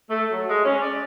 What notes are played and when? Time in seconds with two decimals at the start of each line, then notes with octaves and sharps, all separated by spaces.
0.10 A3
0.31 F#3
0.49 G#3
0.65 C#4
0.81 D5